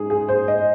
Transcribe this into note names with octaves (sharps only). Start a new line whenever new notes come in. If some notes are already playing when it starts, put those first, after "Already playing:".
Already playing: G#2 G#4
G#4
C5
D#5